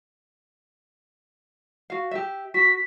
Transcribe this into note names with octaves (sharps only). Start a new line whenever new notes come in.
F#4 F5
G4 E5
F#4 B6